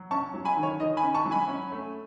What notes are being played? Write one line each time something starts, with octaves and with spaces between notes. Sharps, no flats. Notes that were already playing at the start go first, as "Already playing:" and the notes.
Already playing: F#3
C#4 A5 C#6
F#3
G#5 B5
D#3
C#5
D#3 D#5
G#5 B5
C#4
A5 C#6
F#3
G#5 B5
C#4
A3